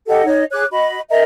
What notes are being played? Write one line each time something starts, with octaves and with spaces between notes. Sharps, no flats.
G4 A4 D#5 F#5
D#4 C#5 D#5
G#4 C#5 D6 F#6
F#4 D#5 B5
A#4 D#5 E5 A#5